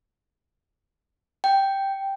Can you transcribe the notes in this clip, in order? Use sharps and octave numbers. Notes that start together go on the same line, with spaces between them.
G5